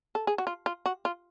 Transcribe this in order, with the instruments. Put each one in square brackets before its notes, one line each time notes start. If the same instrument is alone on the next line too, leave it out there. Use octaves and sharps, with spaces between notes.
[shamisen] A4
G#4
F#4
F4
F4
F#4
F4